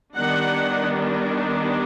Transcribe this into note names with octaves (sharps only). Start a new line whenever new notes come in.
D#3 G3 B3 D4 F#5